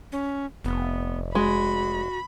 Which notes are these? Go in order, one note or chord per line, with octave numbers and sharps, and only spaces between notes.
C#4
F1 B3
G#3 F#4 B5